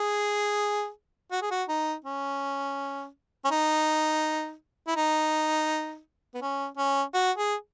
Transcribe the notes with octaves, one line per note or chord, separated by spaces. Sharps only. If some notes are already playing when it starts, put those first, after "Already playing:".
Already playing: G#4
F#4
G#4
F#4
D#4
C#4
C#4
D#4
E4
D#4
B3
C#4
C#4
F#4
G#4